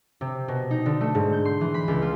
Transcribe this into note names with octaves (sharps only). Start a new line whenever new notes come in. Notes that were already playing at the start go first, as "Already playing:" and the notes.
C3
B2
D#4
D3
A3
G#2
G6
C6
E3
B5
C#2
F4